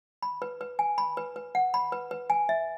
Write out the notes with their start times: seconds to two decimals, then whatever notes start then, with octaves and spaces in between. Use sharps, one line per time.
0.22 B5
0.42 B4
0.61 B4
0.79 G#5
0.98 B5
1.17 B4
1.36 B4
1.55 F#5
1.74 B5
1.92 B4
2.11 B4
2.30 G#5
2.49 E5